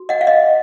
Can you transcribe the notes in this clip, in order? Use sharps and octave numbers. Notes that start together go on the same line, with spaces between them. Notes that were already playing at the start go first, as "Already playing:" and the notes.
Already playing: F#4
D#5 F#5
F5
D#5